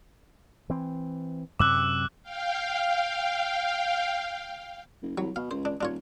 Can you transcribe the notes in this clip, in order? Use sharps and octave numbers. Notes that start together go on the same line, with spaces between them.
E3 C4
F#2 C3 D6 E6 F#6
F5 G5
F#1
C2 F#3
B2 F5
C#2 C5
D4
D#1 D4 F4 C#5